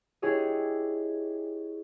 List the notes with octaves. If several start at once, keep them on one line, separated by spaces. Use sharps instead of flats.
D4 E4 G4 G#4 C#5 D#5